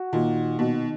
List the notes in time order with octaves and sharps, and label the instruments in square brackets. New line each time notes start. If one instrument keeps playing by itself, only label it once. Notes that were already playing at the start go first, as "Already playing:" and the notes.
Already playing: [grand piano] F#4
[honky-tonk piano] A#2 [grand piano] D#3
[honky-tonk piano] B2 [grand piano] D#3